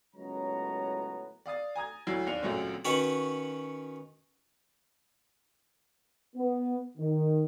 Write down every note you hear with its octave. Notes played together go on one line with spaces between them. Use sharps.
C#2 F#2 A2 B3 C#5 A#5
D5 F5 D#6 A6
G#5 A#5 D#6 G#6
D2 F#3 E4 C7
D#2 D5 C#7 F7
C#2 F#2 A#2 F#3 A3 C4
D#3 C#4 F#4 B4 F#5
B3
D#3